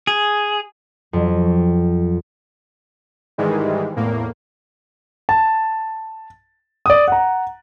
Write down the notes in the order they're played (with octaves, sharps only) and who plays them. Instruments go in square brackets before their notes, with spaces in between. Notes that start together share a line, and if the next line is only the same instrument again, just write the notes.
[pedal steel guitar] G#4
[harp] F2 F#3
[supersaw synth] G#2 D#3 E3 G3 G#3
E2 A2 A#3
[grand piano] A5
D5 D#6
F#5 A#5